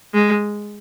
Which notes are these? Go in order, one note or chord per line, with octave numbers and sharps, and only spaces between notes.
G#3